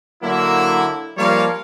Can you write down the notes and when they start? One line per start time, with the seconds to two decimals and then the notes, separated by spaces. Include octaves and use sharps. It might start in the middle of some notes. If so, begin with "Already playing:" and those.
0.22 D3 F#3 A#3 E4
1.18 F3 G3 A#3 C#5 D5 F5